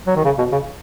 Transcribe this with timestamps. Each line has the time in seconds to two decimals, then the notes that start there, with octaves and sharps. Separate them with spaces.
0.07 F#3
0.16 D#3
0.25 C#3
0.38 B2
0.52 C#3